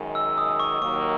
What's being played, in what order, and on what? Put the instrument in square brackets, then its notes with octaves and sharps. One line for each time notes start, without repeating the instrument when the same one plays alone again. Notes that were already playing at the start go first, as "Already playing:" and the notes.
Already playing: [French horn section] F#2 D#3 G#3
[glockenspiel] E6
D#6
C#6
[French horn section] D#2 D#3 F#3 A#3 [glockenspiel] C#6